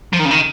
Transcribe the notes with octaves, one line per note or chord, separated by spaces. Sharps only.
F3
D#3
C#3
D#3